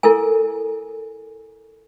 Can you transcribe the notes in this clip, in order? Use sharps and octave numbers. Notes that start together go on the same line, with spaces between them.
E4 A4 A#4 G#5